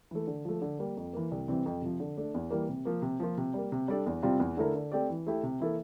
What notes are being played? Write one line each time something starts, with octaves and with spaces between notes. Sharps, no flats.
E3 A3
D3
F3 A3
D3
G3 A#3
F2
E3 A#3
C2
C3 E3 G3 C4
F2
C3 F3
D3
A3 D4
E2
E3 G3 A#3
C3
F3 A#3
C3
F3 A#3 F4
C3
G3 A#3
C3
G3 D4 A4 D5
E2
C3 G3 C4 F4
E2
D3 A3 E4 A#4
D3
A3 C4 G4 D5
E3
A3 E4 G4
C3
E3 A#3 E4 A4